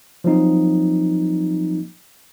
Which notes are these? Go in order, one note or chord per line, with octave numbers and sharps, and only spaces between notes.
F3 F#3 A#3 C4 D#4